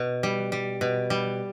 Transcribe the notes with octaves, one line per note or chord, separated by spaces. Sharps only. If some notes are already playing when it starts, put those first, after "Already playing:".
Already playing: B2
G3
G3
B2
G3